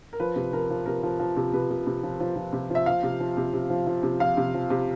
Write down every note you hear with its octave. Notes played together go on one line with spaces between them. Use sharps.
A#4
F3 B4
C3
F3 A#4
F3
C3 A#4
F3
F3
C3
C3 B4
C3
C3
F3
F3
F3
C3
F3 E5
F3 F5
C3
F3
C3
C3
F3
F3
C3
F3 F5
C3
F3
C3